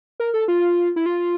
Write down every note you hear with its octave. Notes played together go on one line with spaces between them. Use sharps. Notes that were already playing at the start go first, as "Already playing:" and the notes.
A#4
A4
F4
E4
F4